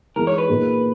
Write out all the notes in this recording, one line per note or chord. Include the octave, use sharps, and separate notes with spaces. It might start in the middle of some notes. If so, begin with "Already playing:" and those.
E3 G#3 D#4 G#4 A#4
C#5
B4
A#2 A#3 D#4 G#4